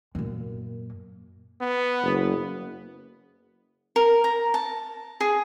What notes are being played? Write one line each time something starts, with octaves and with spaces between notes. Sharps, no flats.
F#2 A#2
B3
F#1
A#4
A#5
A5
G#4